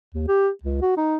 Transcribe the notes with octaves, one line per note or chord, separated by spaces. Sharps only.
D#2
G4
C#2
F#4
D#4